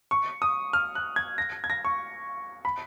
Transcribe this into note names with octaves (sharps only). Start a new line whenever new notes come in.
C#6
D#6
F6
F#6
G#6
A#6
G#6
A#6
C#6
B5